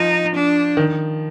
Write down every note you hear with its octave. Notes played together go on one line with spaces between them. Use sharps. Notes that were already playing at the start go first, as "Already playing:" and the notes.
Already playing: F3 D#4
D4
D#3